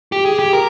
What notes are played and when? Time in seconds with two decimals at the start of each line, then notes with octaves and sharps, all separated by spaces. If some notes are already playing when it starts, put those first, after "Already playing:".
0.12 G4
0.26 G#4
0.39 G4
0.53 A#4